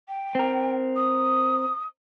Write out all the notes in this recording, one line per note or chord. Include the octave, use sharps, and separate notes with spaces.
G5
C4 A#4
D#6